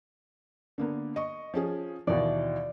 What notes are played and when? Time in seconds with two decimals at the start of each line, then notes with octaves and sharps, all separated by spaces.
0.78 D3 A#3 B3
1.16 D#5 C#6
1.54 F3 C#4 G#4
2.07 D#2 B2 E3 D5